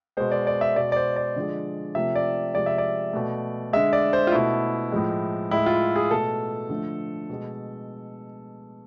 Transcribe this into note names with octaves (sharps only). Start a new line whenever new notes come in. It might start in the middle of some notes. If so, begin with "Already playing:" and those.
B2 G#3 C5
D5
D5
E5
B2 G#3 D5
D5
C5
D5
D3 F3 G#3
C3 F3 A3 E5
D5
C3 F3 G#3 D5
E5
D5
B2 A3
D3 G#3 E5
D5
C5
F4
B2 A3 E4
A2 F3 G#3
A2 G#3 E4
F4
G#4
B2 A3 A4
D3 F3 A3
B2 G#3